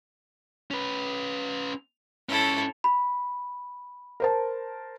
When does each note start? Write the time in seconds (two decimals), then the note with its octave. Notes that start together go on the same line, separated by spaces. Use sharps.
0.71 C#4 B4
2.29 G#2 C#4 E4 A4
2.84 B5
4.20 A#4 C5 A5